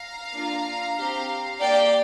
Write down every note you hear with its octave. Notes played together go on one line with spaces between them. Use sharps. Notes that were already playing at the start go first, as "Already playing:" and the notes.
Already playing: F5 A#5
A#3 D4 F4
C4 G4
A#3 G4 D5 G5